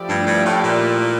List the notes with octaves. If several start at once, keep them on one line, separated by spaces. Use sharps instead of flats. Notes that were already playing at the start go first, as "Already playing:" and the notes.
Already playing: F3 A3 E4 G4 D5
G2
G2
A2
A#2